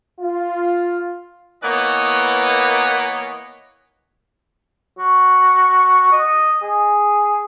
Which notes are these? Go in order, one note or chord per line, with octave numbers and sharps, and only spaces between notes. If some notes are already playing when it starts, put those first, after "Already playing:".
F4
E3 A#3 B3 B4 C#5 D#5
F#4
D#5
G#4